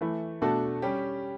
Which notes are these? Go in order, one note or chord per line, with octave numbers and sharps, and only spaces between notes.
E3 A3 E4
B2 A3 D4 F#4 A4
G3 C#4 G4